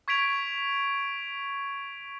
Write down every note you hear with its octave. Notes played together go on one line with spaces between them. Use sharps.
C#6 G#6 B6 D7 F7